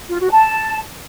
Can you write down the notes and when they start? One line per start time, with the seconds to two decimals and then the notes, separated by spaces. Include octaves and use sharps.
0.10 F4
0.20 F#4
0.30 A5